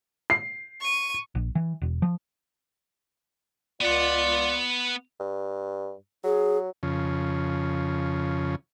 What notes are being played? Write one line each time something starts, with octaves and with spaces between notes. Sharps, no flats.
C7
C#6 D#7
A#1
E3
E1
F3
C#2 B3 F4 D5 F#5
G2
F#3 G#4
F2 C#3